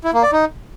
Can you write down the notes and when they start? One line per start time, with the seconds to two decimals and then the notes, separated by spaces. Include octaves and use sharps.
0.04 E4
0.14 A#3
0.23 D5
0.32 D#4